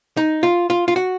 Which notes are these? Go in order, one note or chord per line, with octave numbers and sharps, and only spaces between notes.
D#4
F4
F4
F4
F#4